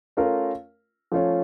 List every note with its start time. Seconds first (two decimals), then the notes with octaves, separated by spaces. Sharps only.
0.17 A3 C#4 F4 A#4
1.12 F3 A3 C#4 F4 C#5